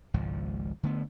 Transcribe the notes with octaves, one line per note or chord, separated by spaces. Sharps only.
G#1 C#2 G#2 F3
D3 A3 B3